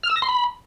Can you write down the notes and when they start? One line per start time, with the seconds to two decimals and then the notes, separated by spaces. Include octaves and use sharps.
0.03 F6
0.10 E6
0.16 A#6
0.22 C6
0.29 B5